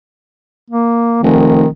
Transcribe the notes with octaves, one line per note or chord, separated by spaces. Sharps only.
A#3
F1 D#3